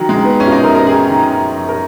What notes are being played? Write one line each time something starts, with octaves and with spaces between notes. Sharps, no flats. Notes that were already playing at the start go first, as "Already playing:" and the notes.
Already playing: D#3 F#3
G#3
D#3
B3
F#2 C#4
F4
D#4
F#2 A#4
A#4
D#3 G#4
D#3
F#2
F#2
A#4